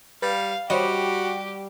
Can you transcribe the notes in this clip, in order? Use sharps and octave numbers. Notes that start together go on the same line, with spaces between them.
G3 B4 F5
G3 F#4 G4 C5 C#5 D#5